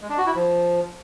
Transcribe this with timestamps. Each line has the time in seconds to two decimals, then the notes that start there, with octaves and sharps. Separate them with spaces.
0.01 G#3
0.09 D4
0.18 F#4
0.26 E4
0.35 F3